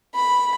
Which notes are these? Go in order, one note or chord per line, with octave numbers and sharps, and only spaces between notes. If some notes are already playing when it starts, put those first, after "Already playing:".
B5